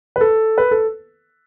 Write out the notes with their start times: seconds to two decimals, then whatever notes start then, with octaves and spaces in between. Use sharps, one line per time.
0.16 B4
0.21 A4
0.58 B4
0.71 A4